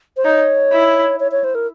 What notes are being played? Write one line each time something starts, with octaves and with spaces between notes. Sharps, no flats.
C5
D#4 C#5
E4
C#5
C#5
C5
A#4